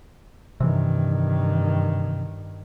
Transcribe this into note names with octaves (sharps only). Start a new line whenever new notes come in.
G2 C3 D#3 E3